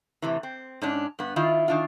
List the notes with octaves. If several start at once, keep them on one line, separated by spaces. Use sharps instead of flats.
A2 C3 E3
C4
G#2 C#4 D4
G2 B3
D#3 E4 F4
D#3 D4 F4